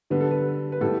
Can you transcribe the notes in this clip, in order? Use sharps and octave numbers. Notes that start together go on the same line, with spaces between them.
D3 G3 B3 B4
A4
B4
B4
A2 G3 B3 A4